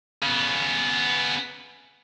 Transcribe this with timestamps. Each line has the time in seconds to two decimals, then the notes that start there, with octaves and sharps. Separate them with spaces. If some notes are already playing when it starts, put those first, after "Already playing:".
0.23 C#3 B3